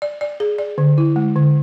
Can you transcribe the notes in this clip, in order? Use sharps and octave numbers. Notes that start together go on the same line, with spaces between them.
D5
D5
G#4
D5
D3
E4
G#3
D3